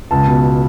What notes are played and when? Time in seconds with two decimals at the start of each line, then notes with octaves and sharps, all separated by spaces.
0.11 C#2 A5
0.27 B2